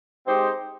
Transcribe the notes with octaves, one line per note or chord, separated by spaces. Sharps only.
G#3 C4 D#4 G4 C5